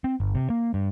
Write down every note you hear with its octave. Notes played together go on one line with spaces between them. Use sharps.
C4
G1
C3
A#3
G2